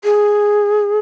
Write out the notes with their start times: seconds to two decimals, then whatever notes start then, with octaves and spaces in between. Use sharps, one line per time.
0.04 G#4